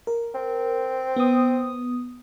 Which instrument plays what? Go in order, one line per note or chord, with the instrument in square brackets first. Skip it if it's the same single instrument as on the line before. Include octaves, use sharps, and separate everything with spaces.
[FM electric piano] A#4
[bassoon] C4
[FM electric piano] B3 D#6